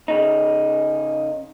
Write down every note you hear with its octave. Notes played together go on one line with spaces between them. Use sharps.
C#3 D#4